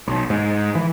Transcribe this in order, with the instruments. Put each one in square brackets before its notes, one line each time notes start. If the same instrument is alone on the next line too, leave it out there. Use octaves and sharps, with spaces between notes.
[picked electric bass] B1
G#2
E3